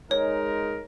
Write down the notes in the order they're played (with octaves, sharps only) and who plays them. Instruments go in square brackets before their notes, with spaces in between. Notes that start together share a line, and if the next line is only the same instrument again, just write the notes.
[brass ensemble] G#3 D#4 A#4 [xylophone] C#5